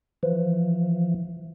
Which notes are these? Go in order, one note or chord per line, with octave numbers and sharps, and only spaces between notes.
E3 F3